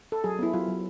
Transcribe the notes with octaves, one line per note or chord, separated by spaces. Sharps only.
A4
F#3 G#4
B3 E4
F#3 F4
F#3